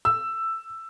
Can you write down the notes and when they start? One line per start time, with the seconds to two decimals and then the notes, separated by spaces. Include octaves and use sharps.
0.05 E6